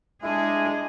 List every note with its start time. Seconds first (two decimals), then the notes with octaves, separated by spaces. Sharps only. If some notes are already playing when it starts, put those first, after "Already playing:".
0.23 G#3 D4 E4 G#4